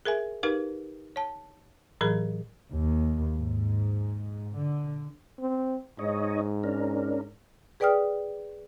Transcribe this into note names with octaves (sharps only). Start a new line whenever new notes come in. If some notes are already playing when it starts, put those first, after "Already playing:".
G#4 A#4 E5 G#5
D#4 G4 A#4 B4 F5
C#5 A5
A2 E3 F#3 G#4 A#4 B5
D#2
G#2
D3
C4
G#2 D#4 C#5 D#5
C#4 D4 A#4
G#4 B4 D5 G5 D#6 F6